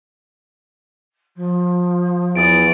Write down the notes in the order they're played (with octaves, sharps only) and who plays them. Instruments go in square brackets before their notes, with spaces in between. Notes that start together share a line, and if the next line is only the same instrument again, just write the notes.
[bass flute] F3
[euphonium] E2 [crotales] D#6 A6 D7